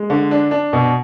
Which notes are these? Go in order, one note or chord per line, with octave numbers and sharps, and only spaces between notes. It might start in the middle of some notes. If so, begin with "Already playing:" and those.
Already playing: G#3
D3
D4
D4
B2